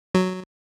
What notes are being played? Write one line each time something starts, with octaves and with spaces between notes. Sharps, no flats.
F#3